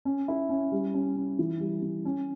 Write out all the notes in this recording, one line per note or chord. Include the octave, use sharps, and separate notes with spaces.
C#4
E4
C#4
G3
C#4
C#4
E3
G3
E3
C#4